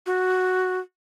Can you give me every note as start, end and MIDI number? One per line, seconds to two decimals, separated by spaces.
0.06 0.78 66